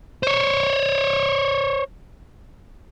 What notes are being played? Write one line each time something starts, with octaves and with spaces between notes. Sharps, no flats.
C5 C#5